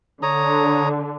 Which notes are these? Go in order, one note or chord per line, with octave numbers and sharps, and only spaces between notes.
D3 C#5 A#5 D#6